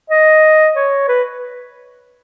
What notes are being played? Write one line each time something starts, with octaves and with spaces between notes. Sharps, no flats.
D#5
C#5
B4